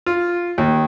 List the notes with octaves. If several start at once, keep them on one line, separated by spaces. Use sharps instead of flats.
F4
D#2